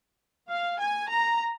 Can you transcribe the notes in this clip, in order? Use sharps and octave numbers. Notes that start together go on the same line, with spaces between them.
F5
G#5
A#5